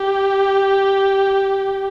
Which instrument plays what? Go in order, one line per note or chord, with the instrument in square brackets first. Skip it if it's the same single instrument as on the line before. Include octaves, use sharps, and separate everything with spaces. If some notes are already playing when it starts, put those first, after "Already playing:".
Already playing: [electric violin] G4